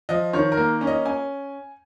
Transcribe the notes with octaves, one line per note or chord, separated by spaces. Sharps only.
F3 D#5
D#3 C#5
A#4
A#3
C#4
D#5
C#4 G#5